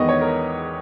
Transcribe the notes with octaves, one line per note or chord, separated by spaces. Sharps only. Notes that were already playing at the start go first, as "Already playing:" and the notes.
Already playing: E2 D#3 G#3 B3 D#5 C#6
C#5
A#4